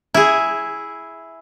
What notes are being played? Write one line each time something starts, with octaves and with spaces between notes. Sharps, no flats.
E4 G#4